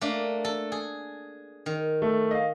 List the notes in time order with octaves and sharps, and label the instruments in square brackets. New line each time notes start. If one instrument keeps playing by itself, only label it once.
[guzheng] A3 A#3 D4
A4
G#4
D#3
[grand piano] A3
D#5 F5